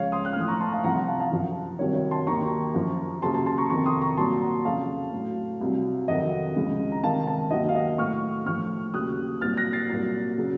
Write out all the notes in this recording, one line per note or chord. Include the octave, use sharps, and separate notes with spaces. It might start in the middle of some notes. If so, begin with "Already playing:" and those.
Already playing: C#2 C#3 F3 C#5 F5
C6 D#6
F#6
F6
A2 F3 D#6
A#5 C#6
A5 C6
F5 A5
C2 C3 F3 F#5 A#5
F#5 A#5
F5 A5
F5 A5
F#2 F3
C2 C3 D#3 F#3 C#5
C#5
A5 C6
D#2 D#3 F#3 A#5 C#6
F#2 F3
D#2 C#3 F#3 A5 C6
A5 C6
A5 C6
A#5 C#6
F2 C3 D#3 A#5 C#6
C6 D#6
A#5 C#6
C2 A#2 F#3 A5 C6
F#5 A#5
F2 C#3 F#3 F5 A5
A2 F#3
C2 C3 F#3
F2 C3 D#3 F#3 D#5 F#5
C#2 C#3 F3
A#5
C#2 C3 D#3 F5 A5
F5 A5
D#2 D#3 F#3 D#5 F#5
F5
D#5 F#5
A2 F#3 C#6 F6
A2 F3 C#6 F6
D#2 C#3 F#3 D#6 F#6
C2 A#2 F#3 F6 A6
F#6 A#6
A6 C7
C2 A#2 F#3
C#3 F#3